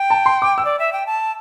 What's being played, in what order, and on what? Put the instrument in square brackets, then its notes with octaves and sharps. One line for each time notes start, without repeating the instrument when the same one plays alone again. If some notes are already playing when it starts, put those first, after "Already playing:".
Already playing: [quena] G5
[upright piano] A5
C6
D6
E6
[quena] D5
E5
G5
A5